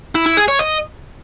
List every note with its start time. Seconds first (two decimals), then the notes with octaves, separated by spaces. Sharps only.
0.15 E4
0.26 E4
0.37 G#4
0.48 C#5
0.59 D#5